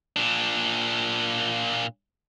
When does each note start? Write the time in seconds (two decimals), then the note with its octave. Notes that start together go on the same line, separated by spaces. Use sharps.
0.16 A#2 D4